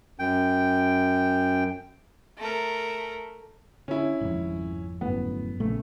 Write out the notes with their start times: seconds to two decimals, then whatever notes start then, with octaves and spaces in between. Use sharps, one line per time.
0.19 F#2 G5
2.38 A3 A#4
3.88 D3 C#4 E4
4.21 G#1 F2 G#2
5.01 G1 F#2 A2 B3
5.60 A#1 C#3 A3